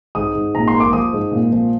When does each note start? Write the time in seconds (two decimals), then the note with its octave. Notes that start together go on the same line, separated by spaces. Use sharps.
0.15 G#2 D#6
0.34 G#2
0.55 A#2 A#5
0.68 C6
0.74 A#3
0.80 D6
0.93 F3 D#6
1.13 G#2
1.31 A#2
1.52 F3